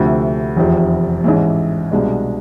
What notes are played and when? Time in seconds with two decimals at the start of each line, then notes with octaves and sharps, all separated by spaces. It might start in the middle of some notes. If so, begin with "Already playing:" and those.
Already playing: D2 C3 F3 A3
0.56 F1 E2 C3 F3
1.24 A1 G#2 E3
1.91 C2 B2 G#3 D4